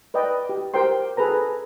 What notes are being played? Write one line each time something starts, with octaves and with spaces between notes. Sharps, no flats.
B4 D5 D#5 G5
G4
G4 A#4 C5 G5 C6
G#4 A4 B4 A#5